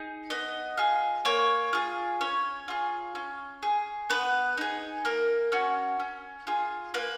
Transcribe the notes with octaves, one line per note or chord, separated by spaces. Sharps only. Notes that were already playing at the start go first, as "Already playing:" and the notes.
Already playing: D#4 G#4
B3 D#5
F4 G#4
A#3 C#5
F4 G#4
C#4 C#5
F4 G#4
C#4
G#4
B3 B4
D#4 G#4
A#3 A#4
C#4 F#4
C#4
F4 G#4
A#3 B4